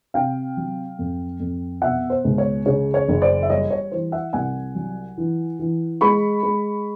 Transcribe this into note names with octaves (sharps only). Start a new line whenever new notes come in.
C3 F5 G5
F#3
F2
F2
B2 E5 F#5
C5
C#2
C#5
C#3 C#5
C#5
F#1
C5 D5
E5
G3 C#5 D#5
C#5
E3 C5
E5 F#5
C2 F#5 G#5
F#3
E3
E3
G#3 B5 C#6
G#3